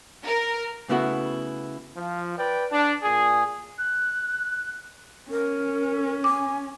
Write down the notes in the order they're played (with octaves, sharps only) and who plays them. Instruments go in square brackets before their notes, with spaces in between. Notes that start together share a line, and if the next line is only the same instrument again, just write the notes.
[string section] A#4
[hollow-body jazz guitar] C#3 A3 B3 E4 F#4
[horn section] F3
B4 D5 G5
D4
A#2 G#4
[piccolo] F#6
[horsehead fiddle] C#4 [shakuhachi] A#4
[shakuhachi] G#5 [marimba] D6